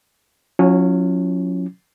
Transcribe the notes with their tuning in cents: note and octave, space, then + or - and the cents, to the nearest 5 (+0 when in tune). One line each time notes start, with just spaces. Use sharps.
F#3 -35 C#4 +0 E4 +35